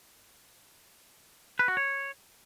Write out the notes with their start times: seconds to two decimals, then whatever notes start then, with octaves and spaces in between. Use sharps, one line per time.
1.59 B4
1.68 F#4
1.77 C#5